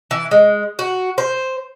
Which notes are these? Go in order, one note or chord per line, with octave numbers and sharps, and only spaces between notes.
E3
G#3
F#4
C5